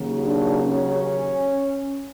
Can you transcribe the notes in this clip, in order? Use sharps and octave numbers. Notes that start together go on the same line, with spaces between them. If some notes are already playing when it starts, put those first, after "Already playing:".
Already playing: D#2 C#3 F#3
D4
C#4